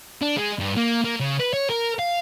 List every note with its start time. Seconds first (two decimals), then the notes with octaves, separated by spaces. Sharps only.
0.22 D4
0.37 G#3
0.60 G2
0.77 A#3
1.04 A#3
1.20 C#3
1.40 B4
1.53 C#5
1.69 A#4
1.99 F5